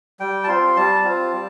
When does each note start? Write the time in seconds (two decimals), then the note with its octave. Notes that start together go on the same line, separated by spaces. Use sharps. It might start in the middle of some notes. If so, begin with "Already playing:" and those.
0.20 G3 G5
0.44 A5
0.47 C4 F4 C6
0.76 G3 A5
1.04 C4 F4
1.32 G3